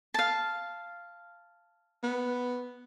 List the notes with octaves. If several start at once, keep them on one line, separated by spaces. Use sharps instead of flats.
F5 A5
B3